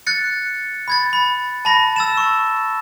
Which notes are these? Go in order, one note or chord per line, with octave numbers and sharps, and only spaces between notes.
F#6 A6 C#7
B5 G#6 A6
B5
A5 B5 A#6
E6 A6 E7
C#6